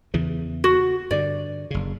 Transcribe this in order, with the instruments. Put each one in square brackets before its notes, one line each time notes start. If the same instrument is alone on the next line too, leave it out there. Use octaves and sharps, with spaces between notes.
[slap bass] E2 C#3 E3
[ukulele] F#4
[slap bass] G2 D3 [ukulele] D5
[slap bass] F#1 C#3